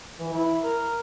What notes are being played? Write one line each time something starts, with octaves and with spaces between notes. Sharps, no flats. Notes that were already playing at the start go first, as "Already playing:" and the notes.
E3
E4
A#4